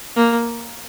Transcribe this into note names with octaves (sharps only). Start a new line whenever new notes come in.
A#3